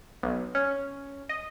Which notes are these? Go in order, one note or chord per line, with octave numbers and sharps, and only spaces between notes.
B1
C#4
D#5